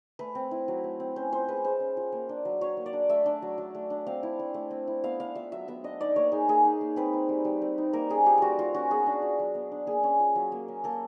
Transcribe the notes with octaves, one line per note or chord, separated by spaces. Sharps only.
A3 B4
C4
E4
F#3
A3
C4
C#4 C5
F4 C5
G#3 B4
G#3 C5
C#4
F4
A#3
D4
F#3
F#3 C#5
A#3
D5
D4
A3 E5
D4
F#3
F#3
A3
D4
C4 F5
E4
A3
A3
C4
E4
B3 F5
D4 F5
F4 E5
F#3 E5
B3 E5
D4 D#5
D#4 D5
A#3 C#5
D#4 G#4
A#3 G#4
D#4
A#3
C4 B4
D#4
G3
G3
C4
D#4
A#3 A#4
C#4 G#4
F4 G4
G3 F4 F#4
A#3 F4
C#4 F#4
B3 G#4
D4
F4
F#3
B3
D4
A#3 G#4
C#4
F4
F#3
A#3
C#4
A#3 A4